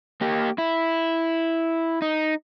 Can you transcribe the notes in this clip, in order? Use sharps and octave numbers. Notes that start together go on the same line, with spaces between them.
A#3 G4
E4
D#4